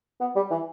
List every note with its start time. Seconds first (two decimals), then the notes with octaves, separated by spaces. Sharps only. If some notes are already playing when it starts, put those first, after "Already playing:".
0.20 B3
0.35 G3
0.51 E3